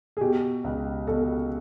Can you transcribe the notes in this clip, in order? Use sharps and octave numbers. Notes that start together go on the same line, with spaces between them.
G#4
B2 G4
C#2
B2 A4